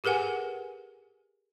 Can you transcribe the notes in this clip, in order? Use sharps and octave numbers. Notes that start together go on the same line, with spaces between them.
G4 G#4 A#4 B4 F#5 G#5